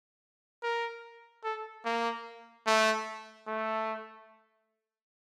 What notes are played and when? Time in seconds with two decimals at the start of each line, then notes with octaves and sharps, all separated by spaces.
0.63 A#4
1.44 A4
1.85 A#3
2.67 A3
3.47 A3